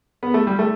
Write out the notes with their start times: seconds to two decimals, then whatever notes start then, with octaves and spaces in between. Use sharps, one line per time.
0.23 B3
0.34 A3
0.47 G3
0.59 A3